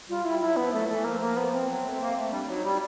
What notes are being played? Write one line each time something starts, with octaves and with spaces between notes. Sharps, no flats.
G3 F4
G3 E4
F#3 E4
F3 B3
F#3 A3
E3 A3
F3 A#3
A#3
B3
C4
F#3
A3
A#3
A3
G3 D4
F#3 D#4
G3